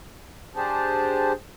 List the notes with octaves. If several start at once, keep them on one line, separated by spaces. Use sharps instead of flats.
D4 G4 G#4 C5 A5